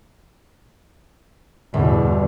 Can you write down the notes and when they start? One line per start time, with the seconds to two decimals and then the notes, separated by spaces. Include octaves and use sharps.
1.74 G1 E2 B2